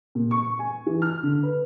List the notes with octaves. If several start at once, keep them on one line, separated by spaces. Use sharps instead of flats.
A#2
C#6
G#5
E3
F6
D3
B4